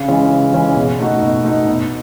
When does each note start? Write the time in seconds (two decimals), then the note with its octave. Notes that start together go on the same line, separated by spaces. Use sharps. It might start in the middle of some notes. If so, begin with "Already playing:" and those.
Already playing: C#3
0.08 E3 G#3 C#4
0.31 C#3
0.53 E3 G#3 C#4
0.76 B2
1.00 A3 D#4 F#4
1.22 B2
1.45 A3 D#4 F#4
1.67 B2